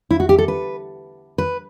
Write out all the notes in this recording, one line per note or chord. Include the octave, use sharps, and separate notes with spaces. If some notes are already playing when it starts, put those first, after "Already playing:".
E4
F#4
G4
A4
B4
B4